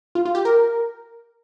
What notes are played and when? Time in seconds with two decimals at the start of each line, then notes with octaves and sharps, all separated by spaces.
0.15 F4
0.25 F4
0.35 G4
0.45 A#4